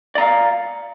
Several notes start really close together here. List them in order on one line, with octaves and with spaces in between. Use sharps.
D5 A#5 F5